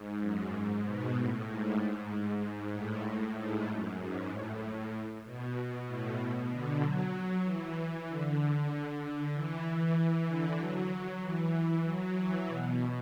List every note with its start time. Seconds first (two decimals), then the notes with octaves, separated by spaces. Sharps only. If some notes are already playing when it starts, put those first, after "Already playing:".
Already playing: G#2
0.21 F#2
0.53 G#2
0.84 B2
1.16 A2
1.47 G#2
2.10 G#2
2.72 A2
3.04 A2
3.36 G#2
3.67 F#2
3.99 G#2
4.30 A2
5.25 B2
5.56 B2
5.87 A2
6.18 B2
6.50 D3
6.81 F#3
7.44 E3
7.75 E3
8.08 D3
8.39 D3
9.33 E3
9.64 E3
10.26 D3
10.58 F#3
11.22 E3
11.85 F#3
12.16 E3
12.47 B2